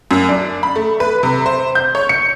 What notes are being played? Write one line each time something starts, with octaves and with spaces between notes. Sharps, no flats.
F#2
D4
B5
A3
B4
C3
C5
G6
C#5
C#7